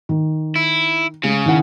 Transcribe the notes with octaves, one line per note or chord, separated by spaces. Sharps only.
D#3
E4
C#3 G#3
D#3 E4 F#5